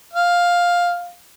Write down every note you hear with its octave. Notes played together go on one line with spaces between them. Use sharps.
F5